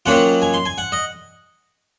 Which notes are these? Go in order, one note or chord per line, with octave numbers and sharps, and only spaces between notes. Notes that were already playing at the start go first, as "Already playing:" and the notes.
D#3 F#3 A#3 C#4 F4 F#5
G#5
C6
G#5
F#5
D#5